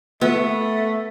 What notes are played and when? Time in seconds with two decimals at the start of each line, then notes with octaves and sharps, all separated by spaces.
0.21 A3 B3